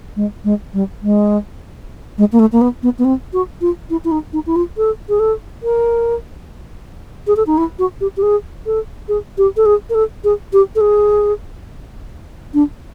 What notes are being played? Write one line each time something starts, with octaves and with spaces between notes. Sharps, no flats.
G#3
G#3
G3
G#3
G#3
A#3
A3
A#3
B3
B3
B3
C4
F#4
F4
E4
E4
D#4
D#4
E4
F4
A4
G#4
A4
A#4
G#4
A4
D#4
E4
F#4
G4
G4
G#4
A4
G#4
G4
A4
G#4
A#4
A4
G#4
G4
A4
G#4
D4